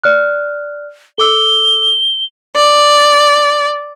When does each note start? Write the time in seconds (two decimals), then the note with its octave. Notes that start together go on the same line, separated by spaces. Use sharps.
0.04 D5 F6 F#6
1.18 A4 D6 E6 G7
2.56 D5